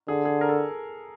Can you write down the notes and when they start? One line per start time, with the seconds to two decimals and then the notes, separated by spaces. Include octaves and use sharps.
0.08 D3 G#4
0.25 G#4
0.41 A#4
0.49 A4